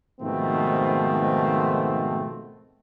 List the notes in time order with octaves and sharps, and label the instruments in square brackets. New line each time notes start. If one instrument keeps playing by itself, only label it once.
[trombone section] G#2 B2 D#3 F3 A3 C4